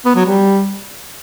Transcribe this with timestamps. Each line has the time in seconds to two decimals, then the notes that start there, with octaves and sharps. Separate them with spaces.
0.05 B3
0.16 F#3
0.26 G3